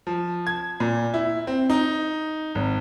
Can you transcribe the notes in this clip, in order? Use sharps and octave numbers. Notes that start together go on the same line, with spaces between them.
F3
G#6
A#2
E4
C4
D#4
G#1